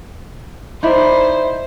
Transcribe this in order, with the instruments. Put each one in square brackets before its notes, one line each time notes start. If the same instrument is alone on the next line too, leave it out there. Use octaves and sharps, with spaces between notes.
[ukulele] D#4 E4 D5 [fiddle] C5